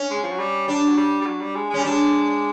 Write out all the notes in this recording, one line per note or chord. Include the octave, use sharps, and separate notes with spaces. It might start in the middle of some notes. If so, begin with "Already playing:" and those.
Already playing: C#4
G#3
F3
F#3
G3
G3 D4
F#3
G3
G3
F#3
G3
G#3
G#3 C#4
G3
G#3 D4